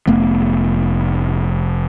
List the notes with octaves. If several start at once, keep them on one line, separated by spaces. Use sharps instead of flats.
F1 A3 B3